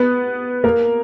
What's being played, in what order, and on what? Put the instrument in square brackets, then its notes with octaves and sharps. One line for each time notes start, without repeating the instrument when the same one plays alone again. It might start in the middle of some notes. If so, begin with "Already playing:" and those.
Already playing: [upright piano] B3 B4
A#3 A#4